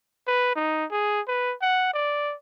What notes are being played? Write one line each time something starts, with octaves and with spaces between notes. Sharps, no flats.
B4
D#4
G#4
B4
F#5
D5